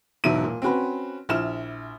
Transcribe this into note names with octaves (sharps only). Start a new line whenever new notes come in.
E1 G#2 B2 F#3 E5 D#7
A#2
C4 C#4 F#4 B4
A#1 E4 F6 E7